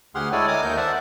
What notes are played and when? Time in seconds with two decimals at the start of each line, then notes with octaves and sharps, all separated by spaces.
0.15 D2 G4 G#4 F#5 C6 F6
0.32 G#3 E4 A4 C#5 D5 G#5
0.48 D#5 G#5 A#5 D6 D#6 F6
0.63 D#2 D#4 A#4 D#5 G6
0.77 C5 D5 E5 F#5 A5